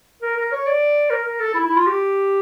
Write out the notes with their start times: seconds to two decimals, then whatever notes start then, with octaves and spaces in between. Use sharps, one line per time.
0.22 A#4
0.37 A#4
0.52 C#5
0.67 D5
1.10 A#4
1.25 A#4
1.40 A4
1.54 E4
1.65 E4
1.76 F4
1.87 G4